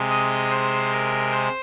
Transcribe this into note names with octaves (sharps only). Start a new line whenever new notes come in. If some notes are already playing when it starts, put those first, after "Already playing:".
Already playing: C3 G#3
D#5
C5
A#4
C5